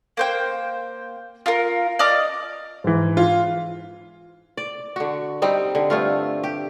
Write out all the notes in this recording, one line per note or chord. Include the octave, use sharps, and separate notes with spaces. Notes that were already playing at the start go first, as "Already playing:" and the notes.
A#3 C5 G5
F4 A#4
D5 D#5 D6 F6
G#2 E3
F4
D5
D3 F#4
G3 C4 D#4
D3
G2 A3 F4
G4